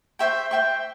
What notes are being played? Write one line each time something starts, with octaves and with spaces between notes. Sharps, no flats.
C5 E5 G5 C#6
C5 E5 G5 C#6